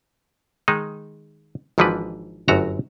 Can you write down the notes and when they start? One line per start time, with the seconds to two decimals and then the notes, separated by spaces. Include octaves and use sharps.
0.68 D#3 G#3 D#4
1.78 G#1 G#2 E3 F3 D4 B4
2.48 G1 F#2 A3 F#4 A#5